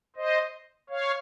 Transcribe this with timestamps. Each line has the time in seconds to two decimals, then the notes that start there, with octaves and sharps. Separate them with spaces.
0.16 C5 D#5
0.89 C#5 F5